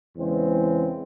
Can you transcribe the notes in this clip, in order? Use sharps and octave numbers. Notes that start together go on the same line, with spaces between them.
E2 C#3 E3 G#3 C4